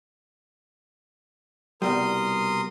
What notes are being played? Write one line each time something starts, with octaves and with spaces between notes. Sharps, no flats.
C2 B2 G3 A#4 C6 D#6